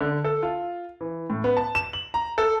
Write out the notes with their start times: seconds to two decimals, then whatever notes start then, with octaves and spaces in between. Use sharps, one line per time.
0.01 D3
0.24 A4
0.43 F4
1.01 E3
1.30 A2
1.44 B3
1.57 A5
1.75 E7
1.93 F#7
2.14 A#5
2.38 A4